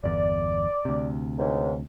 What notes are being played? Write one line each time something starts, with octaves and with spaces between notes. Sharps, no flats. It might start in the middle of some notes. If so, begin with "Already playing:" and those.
G1 E2 D5
D2 C3
C#2 G#2